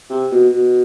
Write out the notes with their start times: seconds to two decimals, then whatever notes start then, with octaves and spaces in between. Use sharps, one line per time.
0.10 C3
0.32 B2
0.52 B2